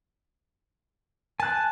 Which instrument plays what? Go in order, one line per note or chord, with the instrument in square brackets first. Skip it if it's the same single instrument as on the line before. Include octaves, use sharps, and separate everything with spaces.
[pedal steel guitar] G#5 F#6 [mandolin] A5